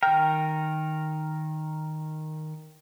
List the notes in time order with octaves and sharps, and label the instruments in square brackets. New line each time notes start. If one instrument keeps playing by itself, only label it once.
[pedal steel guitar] D#3 A#4 [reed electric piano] G5